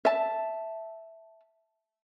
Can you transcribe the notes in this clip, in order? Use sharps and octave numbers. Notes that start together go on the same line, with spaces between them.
E5 A5